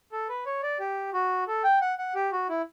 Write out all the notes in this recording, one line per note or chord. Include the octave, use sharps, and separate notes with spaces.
A4
B4
C#5
D5
G4
F#4
A4
G5
F#5
F#5
G4
F#4
E4